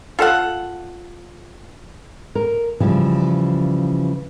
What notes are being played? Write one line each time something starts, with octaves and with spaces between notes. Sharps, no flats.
F4 A4 F5 F#5
A#4
C#3 E3 F3 G3